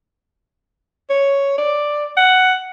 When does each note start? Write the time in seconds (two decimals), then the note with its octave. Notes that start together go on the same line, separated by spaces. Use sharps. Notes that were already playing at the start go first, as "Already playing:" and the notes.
1.10 C#5
1.58 D5
2.17 F#5